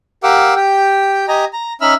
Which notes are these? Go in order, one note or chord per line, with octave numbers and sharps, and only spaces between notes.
G4 A#4 F5 F#5 D6 E6
G4 G5
G4 D#5 G#5 A#5
A#5
C#4 D#4 E5 B5 E6 F6